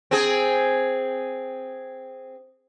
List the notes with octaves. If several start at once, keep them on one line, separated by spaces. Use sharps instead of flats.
C4 G#4